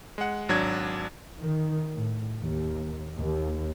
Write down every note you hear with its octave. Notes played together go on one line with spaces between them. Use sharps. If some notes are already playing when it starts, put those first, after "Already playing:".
G#3 F#5
G#1 F#3 D4 G#6
D#3
A2
D#2
D#2